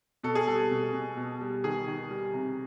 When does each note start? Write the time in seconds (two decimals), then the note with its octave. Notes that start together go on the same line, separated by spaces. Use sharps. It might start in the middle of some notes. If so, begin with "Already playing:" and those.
0.23 B2 A4
0.35 G#4
0.47 G3 A4
0.71 B2
0.93 B2
1.17 B2
1.41 G3
1.64 D#3 G#4
1.87 D#3
2.10 G3
2.33 C3